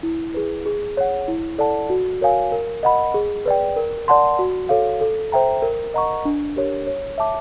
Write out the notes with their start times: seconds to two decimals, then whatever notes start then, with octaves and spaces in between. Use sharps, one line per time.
0.03 E4
0.34 G#4 B4
0.66 G#4
0.97 C#5 F#5
1.28 E4
1.58 A4 D5 F#5 A5
1.90 F#4
2.21 A#4 C#5 F5 G#5
2.52 A#4
2.83 D#5 F#5 B5
3.14 G#4
3.46 B4 D5 G5
3.76 A#4
4.08 D5 F#5 A5 C6
4.39 F#4
4.69 A4 C#5 F5
5.01 A4
5.32 C5 E5 G5 A#5
5.62 A#4
5.94 D#5 F#5 A#5 C#6
6.25 D4
6.56 G4 A#4 C#5
6.87 C#5
7.18 E5 A5 D6